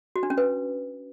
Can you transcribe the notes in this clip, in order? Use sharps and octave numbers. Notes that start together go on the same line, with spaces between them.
F#4
D4
C#4
B4